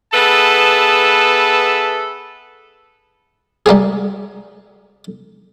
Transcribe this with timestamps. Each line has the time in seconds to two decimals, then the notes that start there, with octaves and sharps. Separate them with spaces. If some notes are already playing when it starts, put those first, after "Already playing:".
0.13 B3 G#4 A4 B4 E5 A5
3.66 G3 A#3 B3 G#4